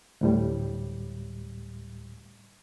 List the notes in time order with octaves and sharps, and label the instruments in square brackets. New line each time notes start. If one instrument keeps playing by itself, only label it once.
[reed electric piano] D2 A2 G3